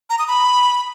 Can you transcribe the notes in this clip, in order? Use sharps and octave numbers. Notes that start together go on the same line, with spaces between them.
A#5
D#6
B5